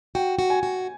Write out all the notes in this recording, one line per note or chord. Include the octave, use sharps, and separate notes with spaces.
F#4 G5
F#4
G#5
F#4